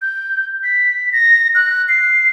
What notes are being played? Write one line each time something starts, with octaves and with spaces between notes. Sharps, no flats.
G6
B6
A#6
F#6
C7